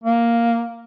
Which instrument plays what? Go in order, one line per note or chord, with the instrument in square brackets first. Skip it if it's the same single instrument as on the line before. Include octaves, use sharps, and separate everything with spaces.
[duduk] A#3